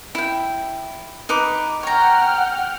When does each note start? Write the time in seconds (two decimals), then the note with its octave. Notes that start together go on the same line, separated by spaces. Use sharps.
0.15 E4 G5
1.29 D#4 B4 D6
1.83 C#5 F#5 G5 A#5 F6